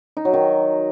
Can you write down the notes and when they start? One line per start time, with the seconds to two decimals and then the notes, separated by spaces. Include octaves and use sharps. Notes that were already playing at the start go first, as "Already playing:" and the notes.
0.17 D#4
0.25 F#3
0.33 D#3